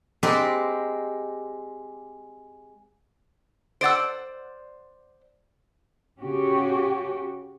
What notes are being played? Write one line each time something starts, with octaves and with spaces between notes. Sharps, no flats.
G#3 C4 G4 A#4 B4 D5
C5 D5 F#5 E6 A6 D7
C#3 C#4 F#4 G4